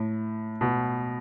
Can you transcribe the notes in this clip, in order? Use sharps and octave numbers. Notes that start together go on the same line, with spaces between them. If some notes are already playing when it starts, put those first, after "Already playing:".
Already playing: A2
B2